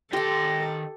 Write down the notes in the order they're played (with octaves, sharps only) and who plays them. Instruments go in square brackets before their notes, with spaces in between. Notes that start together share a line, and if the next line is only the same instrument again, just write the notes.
[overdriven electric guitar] D#3 C6 [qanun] G4 G5 [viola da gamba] A4 [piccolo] A#6